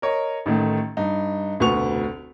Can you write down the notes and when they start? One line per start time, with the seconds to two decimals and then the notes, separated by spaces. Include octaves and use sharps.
0.02 A#4 C#5 D#5
0.46 A1 D#3 A3
0.97 G2 D#4
1.60 F1 D2 B2 B4 C#6 F7